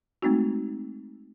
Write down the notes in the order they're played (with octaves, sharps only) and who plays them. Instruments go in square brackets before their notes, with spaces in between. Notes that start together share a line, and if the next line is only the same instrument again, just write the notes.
[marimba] G#3 A3 C4 D#4 F#4